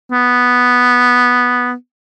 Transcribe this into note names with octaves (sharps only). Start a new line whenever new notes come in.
B3